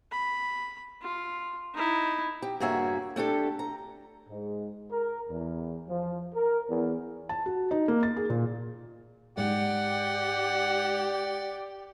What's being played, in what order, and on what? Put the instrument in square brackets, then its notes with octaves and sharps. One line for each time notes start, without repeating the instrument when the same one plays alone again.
[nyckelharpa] B5
F4
D#4 E4
[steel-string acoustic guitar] G4
G2 C#3 A#3 F#4 E5 G#5
A3 D4 G4 A4
A#5
[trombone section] G#2
A#4
E2
F3
A#4
E2
[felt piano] A5
F#4
D#4
A#3
A6
G#4
A#2
[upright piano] G#2 [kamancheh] G4 [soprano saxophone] D5 [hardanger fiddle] F#5